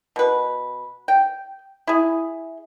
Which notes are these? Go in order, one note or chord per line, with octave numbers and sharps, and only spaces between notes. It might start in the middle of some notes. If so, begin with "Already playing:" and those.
B2 B4
G5
E4 G#4